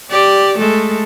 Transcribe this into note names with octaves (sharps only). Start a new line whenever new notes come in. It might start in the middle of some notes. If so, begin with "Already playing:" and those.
G4 D5
G#3 A3 A4